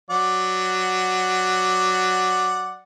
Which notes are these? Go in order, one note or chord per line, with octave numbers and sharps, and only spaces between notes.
F#3 D5 F#5